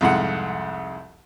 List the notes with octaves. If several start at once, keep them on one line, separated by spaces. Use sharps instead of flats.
C2 F2 G#2 F#5